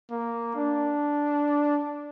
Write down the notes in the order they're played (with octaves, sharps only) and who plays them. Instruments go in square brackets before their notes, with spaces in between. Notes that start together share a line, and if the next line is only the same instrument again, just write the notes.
[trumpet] A#3
D4